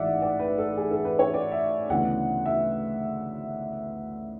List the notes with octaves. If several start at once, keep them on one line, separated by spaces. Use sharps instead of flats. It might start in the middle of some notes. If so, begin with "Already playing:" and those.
Already playing: A1 G#2 E3 G#3 D5 E5 F#5
D5
B4
A4
G#4
A4
B4
C#5
D5
E5
D2 C#3 E3 B3 D4 F#5
E5